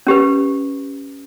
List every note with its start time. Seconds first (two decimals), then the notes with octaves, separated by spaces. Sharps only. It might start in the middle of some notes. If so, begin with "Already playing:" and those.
0.07 C#4 G4 B4